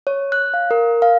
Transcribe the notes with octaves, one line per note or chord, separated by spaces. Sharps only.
C#5
F#6
F5
A#4
F5